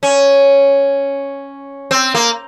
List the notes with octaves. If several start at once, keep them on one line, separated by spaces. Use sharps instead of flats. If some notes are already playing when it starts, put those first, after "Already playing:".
C#4
C4
A#3